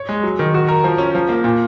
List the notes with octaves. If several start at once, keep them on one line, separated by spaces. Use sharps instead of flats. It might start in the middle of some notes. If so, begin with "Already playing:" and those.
Already playing: C#5
G#3
F#3
D#3
F#4
A#4
F3
C#4
F3
A#3
A#2